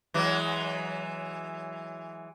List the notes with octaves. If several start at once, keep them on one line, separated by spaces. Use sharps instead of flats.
E3 F#3 G#3